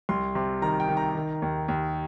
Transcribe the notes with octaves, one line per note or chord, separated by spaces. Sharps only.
C2 C6
C3 C6
D#3 A#5
G5
D#3
A#5
D#3
D#2
D#2